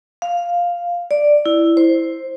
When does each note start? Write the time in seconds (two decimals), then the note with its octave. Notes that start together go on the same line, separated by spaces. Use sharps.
0.22 F5
1.11 D5
1.46 E4
1.77 C5